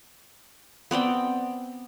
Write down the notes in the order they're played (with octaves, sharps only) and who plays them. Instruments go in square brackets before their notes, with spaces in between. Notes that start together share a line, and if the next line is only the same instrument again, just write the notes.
[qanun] B3 C4 D5 G5